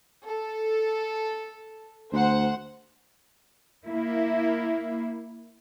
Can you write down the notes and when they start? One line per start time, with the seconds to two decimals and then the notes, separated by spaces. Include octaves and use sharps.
0.25 A4
2.13 D2 C5 F#5
3.87 A#3 E4